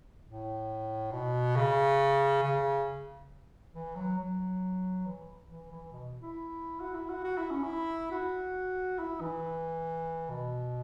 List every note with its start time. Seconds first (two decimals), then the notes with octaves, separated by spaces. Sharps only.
0.25 A2
1.12 B2
1.56 C#3
2.43 C#3
3.74 E3
3.96 F#3
4.18 F#3
5.05 E3
5.49 E3
5.71 E3
5.93 B2
6.22 E4
6.80 F#4
6.95 E4
7.09 F#4
7.24 F#4
7.37 E4
7.50 C#4
7.63 E4
8.11 F#4
8.99 E4
9.21 E3
10.30 B2